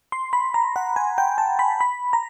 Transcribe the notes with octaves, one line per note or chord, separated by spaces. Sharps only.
C6
B5
A#5
F#5
G#5
G5
A5
B5
B5
A#5